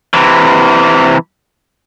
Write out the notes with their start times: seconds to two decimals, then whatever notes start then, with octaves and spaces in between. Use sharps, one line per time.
0.14 C3 E3